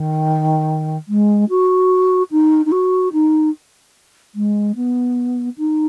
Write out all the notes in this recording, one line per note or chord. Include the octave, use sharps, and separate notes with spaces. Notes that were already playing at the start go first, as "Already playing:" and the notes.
Already playing: D#3
G#3
F#4
D#4
D#4
F#4
D#4
G#3
B3
D#4